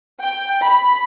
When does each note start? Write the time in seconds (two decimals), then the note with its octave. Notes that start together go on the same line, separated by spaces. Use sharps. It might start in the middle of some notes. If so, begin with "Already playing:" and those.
0.22 G5
0.63 B5